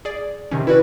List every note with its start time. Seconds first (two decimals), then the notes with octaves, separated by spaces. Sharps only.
0.05 G#4 D5
0.51 C3 D#3 C#4
0.67 E4 F#4 B4 D5